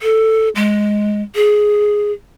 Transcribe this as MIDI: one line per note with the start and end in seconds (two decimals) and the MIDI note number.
0.02 0.49 69
0.55 1.22 56
1.35 2.12 68